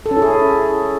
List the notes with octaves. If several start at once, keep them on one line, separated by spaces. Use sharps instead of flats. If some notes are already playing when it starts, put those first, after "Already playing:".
A4
C#4
E4
G#4